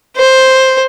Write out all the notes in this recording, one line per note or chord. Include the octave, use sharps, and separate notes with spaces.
C5